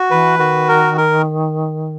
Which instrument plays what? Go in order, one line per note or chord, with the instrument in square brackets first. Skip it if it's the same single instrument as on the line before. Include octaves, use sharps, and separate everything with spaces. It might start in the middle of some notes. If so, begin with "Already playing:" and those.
Already playing: [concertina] F#4
[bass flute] E3 [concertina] B4
[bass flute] D#3 [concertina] F#4
[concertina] A#4
A#4